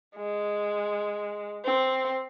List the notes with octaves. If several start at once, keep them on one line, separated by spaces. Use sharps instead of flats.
G#3
C4